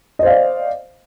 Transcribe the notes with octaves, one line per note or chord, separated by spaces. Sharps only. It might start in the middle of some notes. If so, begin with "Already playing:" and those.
C5 D5 D#5 F5